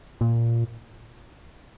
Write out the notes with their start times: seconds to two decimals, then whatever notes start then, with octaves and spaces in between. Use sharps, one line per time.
0.21 A#2